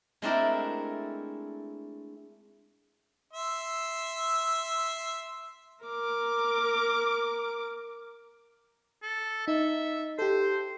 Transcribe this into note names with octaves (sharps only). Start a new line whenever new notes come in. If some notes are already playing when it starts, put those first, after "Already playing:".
G#3 A3 C4 D4 E4 A#4
E5 C6 E6
A#4 D6
A4
D#4 E5
G4 A4 C5